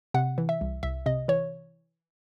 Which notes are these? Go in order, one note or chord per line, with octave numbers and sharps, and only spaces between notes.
C3 F#5
E3
E5
C2
C2 E5
C3 D#5
E3 C#5